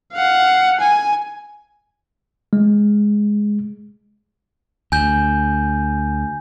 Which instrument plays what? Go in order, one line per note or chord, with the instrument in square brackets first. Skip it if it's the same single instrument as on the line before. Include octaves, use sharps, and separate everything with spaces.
[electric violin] F5 F#5
G#5
[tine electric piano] G#3
[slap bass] D2 [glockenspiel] G#5 G6